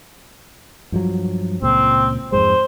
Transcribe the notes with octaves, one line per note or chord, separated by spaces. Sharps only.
G2 F3 F#3
C#2 A#2 C4
F2 G#2 G#3 C5